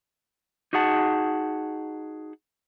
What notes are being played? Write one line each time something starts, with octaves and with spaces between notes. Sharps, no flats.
D#4 F#4 G#4 F#5 A5